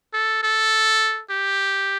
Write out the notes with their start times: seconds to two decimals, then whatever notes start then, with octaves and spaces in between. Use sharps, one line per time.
0.14 A4
0.43 A4
1.30 G4